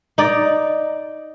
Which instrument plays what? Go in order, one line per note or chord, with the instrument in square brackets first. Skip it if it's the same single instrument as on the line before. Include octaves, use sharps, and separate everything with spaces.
[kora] D#4 D5